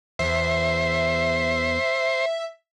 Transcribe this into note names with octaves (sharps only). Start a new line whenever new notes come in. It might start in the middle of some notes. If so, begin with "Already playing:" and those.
E2 C5 E5